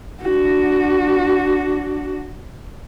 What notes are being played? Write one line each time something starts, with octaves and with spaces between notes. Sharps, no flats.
D4 F#4